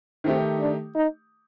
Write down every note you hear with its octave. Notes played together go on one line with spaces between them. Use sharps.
D#3 A3 C4 D#4 G4
D4
D#4